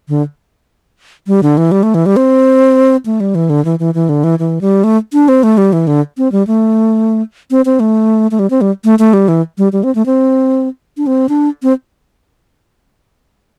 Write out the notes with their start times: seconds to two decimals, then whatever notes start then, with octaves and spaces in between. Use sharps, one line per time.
0.09 D3
1.27 G3
1.43 D3
1.58 E3
1.72 G3
1.83 A3
1.95 E3
2.06 G3
2.16 C4
3.06 A3
3.20 G3
3.35 E3
3.50 D3
3.65 E3
3.79 E3
3.94 E3
4.09 D3
4.24 E3
4.39 E3
4.61 G3
4.84 A3
5.13 D4
5.28 C4
5.43 A3
5.58 G3
5.73 E3
5.87 D3
6.18 C4
6.32 G3
6.47 A3
7.51 C4
7.65 C4
7.80 A3
8.31 A3
8.39 G3
8.50 C4
8.61 G3
8.84 A3
8.99 A3
9.13 G3
9.28 E3
9.58 G3
9.73 G3
9.84 C4
9.95 A3
10.06 C4
10.97 D4
11.07 C4
11.29 D4
11.63 C4